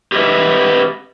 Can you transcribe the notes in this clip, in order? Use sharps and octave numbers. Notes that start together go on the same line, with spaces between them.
G4 G#4 B4 C#5 D#5 E5